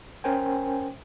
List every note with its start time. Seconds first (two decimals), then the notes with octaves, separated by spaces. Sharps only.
0.24 C#4 A#4 C5 G5 G#5